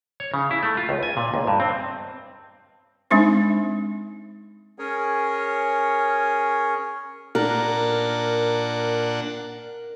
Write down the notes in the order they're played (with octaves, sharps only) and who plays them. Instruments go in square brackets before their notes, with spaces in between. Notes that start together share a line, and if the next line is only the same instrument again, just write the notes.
[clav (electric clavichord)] C#5
C#3
E4
A3
F4
C#2
G#5
A#2
C#2
G2
C4
[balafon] G#3 C4 D4 D#4 C5
[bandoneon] C#4 G#4 A#4 C#5
[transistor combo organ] A#2 D4 F#5 [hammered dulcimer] A#4